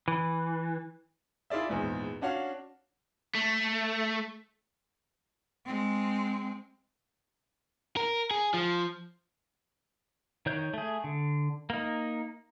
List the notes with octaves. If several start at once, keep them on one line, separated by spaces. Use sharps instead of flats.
E3
E4 F4 G#4 D5 E5
A#1 E2 G#2
C#4 D4 F#4 C#5 F5
A3
G#3 C4
A#4
G#4
F3
D#3 C#5 G6
A3 G#4
D3
A#3 D#4